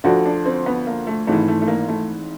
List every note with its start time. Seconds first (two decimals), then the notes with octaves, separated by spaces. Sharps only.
0.04 D2 D3 F3 F#4
0.26 D4
0.46 C4
0.66 B3
0.87 A#3
1.07 A3
1.27 G#1 G#2 E3 A3
1.48 A3
1.61 A3
1.68 A#3
1.88 A3